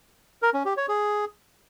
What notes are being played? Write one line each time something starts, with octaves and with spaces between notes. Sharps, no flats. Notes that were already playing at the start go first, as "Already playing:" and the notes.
A#4
C#4
G4
C#5
G#4